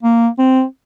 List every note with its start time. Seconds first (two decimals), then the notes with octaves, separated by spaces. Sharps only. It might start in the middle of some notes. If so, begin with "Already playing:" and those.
0.03 A#3
0.39 C4